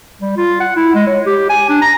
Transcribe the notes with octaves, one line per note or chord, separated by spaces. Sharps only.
G3
F4
F#5
E4
G#3
C#5
G4
G#5
D4
A#5